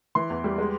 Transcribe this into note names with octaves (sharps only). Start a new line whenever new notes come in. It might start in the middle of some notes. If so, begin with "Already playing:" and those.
E3 C6
E2
G3
G#3